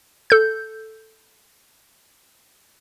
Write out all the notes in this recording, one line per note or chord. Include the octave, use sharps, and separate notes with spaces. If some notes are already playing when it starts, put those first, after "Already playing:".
A4 G6